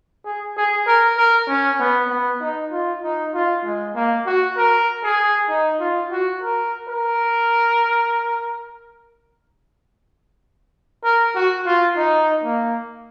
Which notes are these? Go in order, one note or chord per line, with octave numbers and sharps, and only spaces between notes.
G#4
G#4
A#4
A#4
C#4
B3
B3
D#4
F4
D#4
F4
G#3
A#3
F#4
A#4
G#4
D#4
F4
F#4
A#4
A#4
A#4
F#4
F4
D#4
A#3